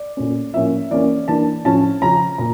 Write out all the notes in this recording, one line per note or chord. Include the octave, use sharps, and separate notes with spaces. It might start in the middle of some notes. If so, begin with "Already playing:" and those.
Already playing: D5
A#2 A3 C#4
A2 F3 A#3 C#4 E5
E3 A#3 C#4 D5
E3 A#3 D4 A5
A2 F3 C#4 A5
C#3 F3 C#4 A#5
A#2 A#5